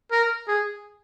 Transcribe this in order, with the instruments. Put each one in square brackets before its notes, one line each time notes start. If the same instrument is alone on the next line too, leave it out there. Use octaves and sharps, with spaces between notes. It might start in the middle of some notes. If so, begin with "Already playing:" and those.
[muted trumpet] A#4
G#4